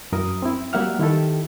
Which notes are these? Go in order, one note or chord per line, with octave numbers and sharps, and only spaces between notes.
F#2 E4 A#4 D#6
C4 E4
F#3 G3 A#3 E5 F#5 F6
D#3 E4 G4 A4